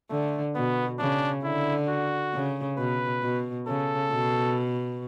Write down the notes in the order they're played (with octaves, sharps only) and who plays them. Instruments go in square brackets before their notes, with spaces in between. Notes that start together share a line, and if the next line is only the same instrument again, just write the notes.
[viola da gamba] D3 [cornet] A3
[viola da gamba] B2 [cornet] B3
[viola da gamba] C#3 [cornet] D4
[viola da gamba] D3 [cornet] E4
[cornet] F#4
[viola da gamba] C#3
[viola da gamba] B2 [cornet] B4
[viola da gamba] B2
[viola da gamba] C#3 [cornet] A4
[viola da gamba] B2